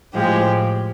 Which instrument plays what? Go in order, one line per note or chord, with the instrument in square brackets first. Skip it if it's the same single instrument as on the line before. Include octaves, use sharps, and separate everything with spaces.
[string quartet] A2 F3 G#3 G4